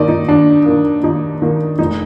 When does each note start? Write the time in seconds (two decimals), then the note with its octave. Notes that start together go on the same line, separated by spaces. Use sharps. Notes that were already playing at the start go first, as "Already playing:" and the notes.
Already playing: D#2 D#3 A#3 D5 D#5
0.08 D#4
0.28 D#2 D4
0.65 D#3 A#3
1.03 D#2 D#4
1.42 D#3 A#3
1.79 F1 D#4